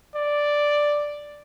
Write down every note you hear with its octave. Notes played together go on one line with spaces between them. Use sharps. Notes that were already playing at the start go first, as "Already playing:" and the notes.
D5